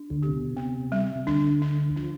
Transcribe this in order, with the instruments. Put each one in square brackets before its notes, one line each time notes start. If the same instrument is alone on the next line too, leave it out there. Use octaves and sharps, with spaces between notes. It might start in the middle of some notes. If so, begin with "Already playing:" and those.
Already playing: [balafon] D4
[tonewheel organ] D2 D3
[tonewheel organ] C3 [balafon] G4
[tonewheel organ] B2
[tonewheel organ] C3 [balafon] B3
[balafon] G3
[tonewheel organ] C3
[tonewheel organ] D2 D3 [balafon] D4
[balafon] D4
[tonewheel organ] F3 [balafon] D4